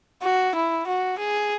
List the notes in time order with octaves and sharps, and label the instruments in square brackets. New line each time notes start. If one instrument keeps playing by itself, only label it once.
[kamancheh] F#4
E4
F#4
G#4